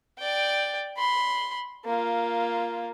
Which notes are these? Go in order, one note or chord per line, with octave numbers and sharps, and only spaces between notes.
D5 G5
B5 C6
A#3 F4